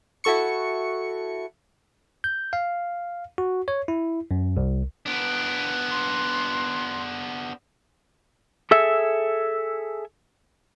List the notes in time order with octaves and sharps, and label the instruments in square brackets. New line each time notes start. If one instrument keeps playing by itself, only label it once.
[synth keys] E4 F#4 A4 C#6 C#7
[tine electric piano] G6
F5
F#4
C#5
E4
F#2
C2
[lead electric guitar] B3 D4 [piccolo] D7
[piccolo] C6
[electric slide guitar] G#4 A4 E5